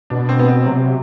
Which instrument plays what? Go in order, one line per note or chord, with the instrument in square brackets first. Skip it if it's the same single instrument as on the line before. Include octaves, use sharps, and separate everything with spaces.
[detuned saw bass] B2 [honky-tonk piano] D4
[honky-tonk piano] C4
B3
C4
[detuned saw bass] C3 [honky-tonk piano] F#3